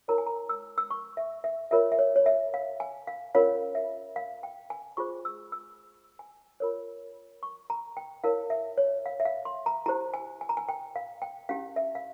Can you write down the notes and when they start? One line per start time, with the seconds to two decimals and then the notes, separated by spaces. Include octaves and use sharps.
0.08 E4 A#4 C#5 A#5
0.18 G#5
0.27 A#5
0.49 E6
0.78 E6
0.91 C#6
1.17 E5
1.44 E5
1.71 F4 A#4 C#5 E5
1.92 E5
1.99 C#5
2.16 C#5
2.26 E5
2.54 F5
2.80 G#5
3.07 F5
3.35 C#4 F4 A#4 C#5 F5
3.75 E5
4.16 F5
4.43 G5
4.70 G#5
4.97 F4 G#4 C5 C#6
5.25 E6
5.52 E6
6.19 G#5
6.60 F4 A#4 C#5
7.43 C#6
7.70 A#5
7.97 G5
8.24 E4 A#4 C#5 F5
8.50 E5
8.78 C#5
9.06 F5
9.20 E5
9.25 F5
9.45 C6
9.66 A#5
9.86 E4 G4 C5 A#5
10.14 G#5
10.41 G#5
10.49 A#5
10.57 G#5
10.69 G5
10.96 F5
11.22 G5
11.49 C#4 E4 G4 F5
11.76 E5
11.95 F5